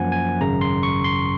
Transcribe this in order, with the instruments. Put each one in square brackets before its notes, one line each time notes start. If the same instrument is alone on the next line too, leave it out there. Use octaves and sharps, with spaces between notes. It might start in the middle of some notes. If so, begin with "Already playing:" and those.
Already playing: [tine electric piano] F#2 F3 A#3 F#5 G#5
G#5
G#1 F#2 C#3 A#5
C6
C#6
C6